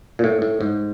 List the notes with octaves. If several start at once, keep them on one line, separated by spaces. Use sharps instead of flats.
A#2
A2
A2
G#2